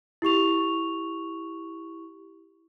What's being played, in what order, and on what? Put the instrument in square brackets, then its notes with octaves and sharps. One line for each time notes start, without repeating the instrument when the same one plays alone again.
[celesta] E4 G4 C#6 F7